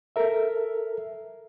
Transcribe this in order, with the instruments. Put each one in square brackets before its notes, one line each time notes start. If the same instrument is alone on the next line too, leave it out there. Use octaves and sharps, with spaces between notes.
[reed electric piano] A4 A#4 E5